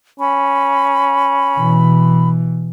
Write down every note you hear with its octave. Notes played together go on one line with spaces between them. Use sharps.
C#4 B5
B2 E3